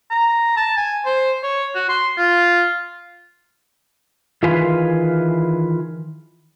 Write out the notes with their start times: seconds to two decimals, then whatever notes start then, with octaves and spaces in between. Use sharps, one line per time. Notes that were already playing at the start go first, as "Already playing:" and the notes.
0.11 A#5
0.57 A5
0.77 G#5
1.06 C5
1.43 C#5
1.75 F#4
1.89 C6
2.18 F4
4.43 D#3 E3 F4 G#4 B4